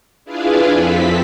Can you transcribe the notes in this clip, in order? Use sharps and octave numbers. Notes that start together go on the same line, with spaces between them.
D4 E4 F4 G#4 B4 F5
F2 C4 A4 B6